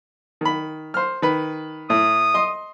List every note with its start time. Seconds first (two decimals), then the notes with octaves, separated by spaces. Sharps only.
0.41 D#3 B5
0.94 C5 F6
1.22 D#3 B4
1.90 A2 D#6
2.34 D#5 C6